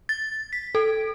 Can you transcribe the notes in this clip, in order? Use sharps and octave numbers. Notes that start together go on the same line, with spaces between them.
A6
B6
A4